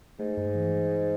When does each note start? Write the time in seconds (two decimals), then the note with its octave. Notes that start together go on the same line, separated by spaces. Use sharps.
0.19 G#2 A3
0.37 G2
0.55 E3